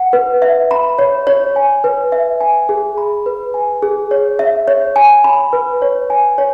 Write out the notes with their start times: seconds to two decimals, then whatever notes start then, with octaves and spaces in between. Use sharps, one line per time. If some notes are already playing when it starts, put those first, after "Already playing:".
Already playing: F#5
0.13 B4
0.42 E5
0.71 B5
0.99 C#5
1.27 C#5
1.56 G#5
1.84 B4
2.12 E5
2.41 G#5
2.69 G#4
2.98 B5
3.26 B4
3.54 G#5
3.82 G#4
4.11 C#5
4.39 E5
4.68 C#5
4.96 G#5
5.24 B5
5.53 B4
5.82 C#5
6.10 G#5
6.38 C#5